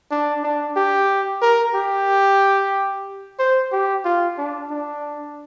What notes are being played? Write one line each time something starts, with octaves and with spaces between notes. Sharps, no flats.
D4
D4
G4
A#4
G4
C5
G4
F4
D4
D4